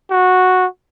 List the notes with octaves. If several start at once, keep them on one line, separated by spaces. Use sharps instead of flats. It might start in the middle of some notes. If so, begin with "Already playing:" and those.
F#4